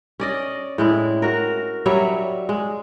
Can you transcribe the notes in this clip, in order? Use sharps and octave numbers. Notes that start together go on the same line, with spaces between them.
C#4 D5 D#5
A2 G#3 E4
F#4 A#4
F#3 G3 C#5 E5
G#3